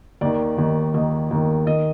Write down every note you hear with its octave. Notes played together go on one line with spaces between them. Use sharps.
D#2 D#3 D5
D#2 D#3
D#2 D#3 D#5
D#2 D#3
D#3 D#5